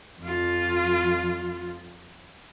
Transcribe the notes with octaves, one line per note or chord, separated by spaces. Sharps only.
F2 F4